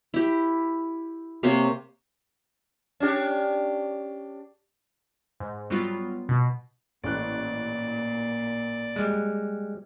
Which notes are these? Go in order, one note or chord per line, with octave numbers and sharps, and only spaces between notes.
E4 G4
C3 A#3 C4 C#5
C#4 D4 G4
G#2
F#3 G3 B3 F4
B2
A1 A#2 D5 F#6
G3 G#3